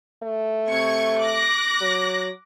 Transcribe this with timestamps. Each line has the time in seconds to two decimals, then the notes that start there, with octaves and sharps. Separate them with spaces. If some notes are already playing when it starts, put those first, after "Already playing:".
0.23 A3
0.68 C3 C#6 G#6
1.21 D6 F#6 A#6
1.81 F#3